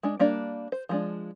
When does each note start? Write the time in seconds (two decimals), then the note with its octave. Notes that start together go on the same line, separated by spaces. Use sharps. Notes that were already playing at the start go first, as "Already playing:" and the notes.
0.03 G#3 D4
0.19 G3 A#3 D4 D5
0.72 C5
0.89 F3 G#3 D4